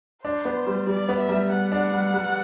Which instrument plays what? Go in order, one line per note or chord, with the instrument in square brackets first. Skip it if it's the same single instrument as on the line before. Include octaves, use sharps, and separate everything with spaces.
[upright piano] D4 [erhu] C5
[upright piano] B3
G3
[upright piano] G3 [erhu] D5
[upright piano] B3
[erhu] E5
[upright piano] G3
[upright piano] G3 [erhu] F#5
[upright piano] D4
G3
G3